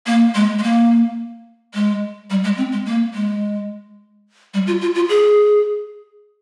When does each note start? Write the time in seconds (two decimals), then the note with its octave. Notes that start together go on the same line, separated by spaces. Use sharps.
0.07 A#3
0.35 G#3
0.59 G#3
0.63 A#3
1.74 G#3
2.30 G3
2.44 G#3
2.57 C4
2.72 G#3
2.86 A#3
3.14 G#3
4.54 G3
4.67 F4
4.81 F4
4.95 F4
5.09 G#4